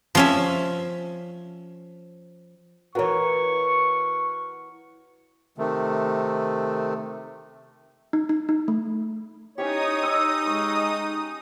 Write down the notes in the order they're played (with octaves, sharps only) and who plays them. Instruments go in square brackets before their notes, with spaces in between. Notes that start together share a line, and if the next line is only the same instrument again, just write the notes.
[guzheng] F3 C#4 E5
[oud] E3 B3 [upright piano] F#4 A#4 C#5 [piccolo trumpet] C#6
[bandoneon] C3 D#3 A3
[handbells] D#4
D#4
D#4
A3
[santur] C#4 E4 G4 [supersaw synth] D#4 D#6 [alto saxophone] C#5
[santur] D#5 E6
[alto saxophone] G#3 [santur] C#6